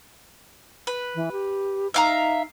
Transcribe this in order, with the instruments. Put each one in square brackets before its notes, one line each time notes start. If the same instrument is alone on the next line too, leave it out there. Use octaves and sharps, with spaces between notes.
[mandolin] B4
[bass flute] E3
G4
[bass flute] D#4 [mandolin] E5 F5 A#5